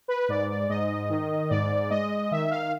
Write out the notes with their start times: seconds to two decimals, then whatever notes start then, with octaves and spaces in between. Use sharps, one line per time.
0.08 B4
0.28 G#2 D5
0.50 D5
0.70 G#2 D#5
1.09 D#3
1.50 G#2 D5
1.90 G#3 D#5
2.31 D#3 E5
2.51 F5